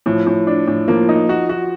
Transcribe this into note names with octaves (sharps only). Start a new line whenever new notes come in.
A2 F3
A2
D4
A2
F3 A#3
D#4
F#4
F#4